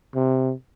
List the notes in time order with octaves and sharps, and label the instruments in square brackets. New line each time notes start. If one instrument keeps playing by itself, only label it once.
[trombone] C3